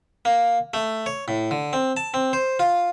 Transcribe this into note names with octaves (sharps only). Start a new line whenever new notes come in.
A#3
A3
C#5
A2
D3
C4
A5
C4
C5
F4